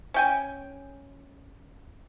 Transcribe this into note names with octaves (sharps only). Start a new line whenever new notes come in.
C#4 G5 G#5